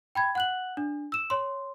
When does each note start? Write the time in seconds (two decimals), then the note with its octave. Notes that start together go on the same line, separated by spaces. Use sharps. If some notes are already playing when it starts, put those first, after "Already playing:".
0.15 G5 B5 G#6
0.35 F#5 F#6 F#7
0.77 D4
1.12 E6 E7
1.30 C#5 C6